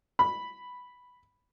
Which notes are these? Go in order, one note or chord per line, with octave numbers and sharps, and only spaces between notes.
B5